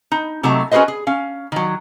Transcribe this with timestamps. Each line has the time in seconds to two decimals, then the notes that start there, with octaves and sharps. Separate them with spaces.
0.12 D#4
0.43 C3 F#3 A3 D#4 F#4 A#5
0.71 C#4 F#4 G#4 B4 C5 D#5
0.88 G#4
1.07 C#4 F5
1.52 D#3 F#3